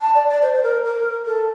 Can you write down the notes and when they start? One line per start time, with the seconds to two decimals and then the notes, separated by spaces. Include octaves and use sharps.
0.01 A5
0.14 D5
0.28 D5
0.42 C5
0.53 C5
0.63 A#4
0.84 A#4
1.26 A4